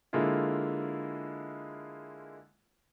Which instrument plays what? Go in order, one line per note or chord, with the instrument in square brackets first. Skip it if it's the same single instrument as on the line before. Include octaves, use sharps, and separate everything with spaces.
[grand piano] D3 G#3 A#3 E4 F4